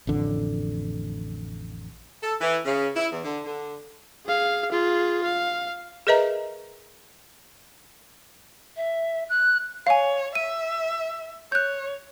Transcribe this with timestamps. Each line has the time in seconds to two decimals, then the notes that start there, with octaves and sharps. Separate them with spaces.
0.07 A1 F2 D3
2.23 A4
2.41 E3
2.65 C#3
2.96 E4
3.12 E2
3.24 D3
3.45 D3
4.26 G#4 F5
4.71 F4 G#4
5.24 F5
6.07 G#4 A#4 B4 D#5 E5 A#5
8.76 E5
9.29 F#6
9.87 C#5 F5 G#5
10.35 E5 D#7
11.52 C#5 F#6 G6